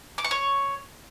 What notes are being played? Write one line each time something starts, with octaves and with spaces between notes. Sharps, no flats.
D6
C#6
C#5